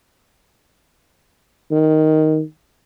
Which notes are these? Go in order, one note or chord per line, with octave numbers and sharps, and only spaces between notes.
D#3